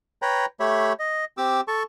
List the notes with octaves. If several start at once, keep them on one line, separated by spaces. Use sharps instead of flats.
B4 C#5 G5 A#5 B5
A3 G4 C#5 E5 B5
D#5
C4 G4 D6 E6
A4 A5 C#6